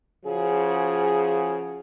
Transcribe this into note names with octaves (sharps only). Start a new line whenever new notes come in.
C#3 F3 F#4 G#4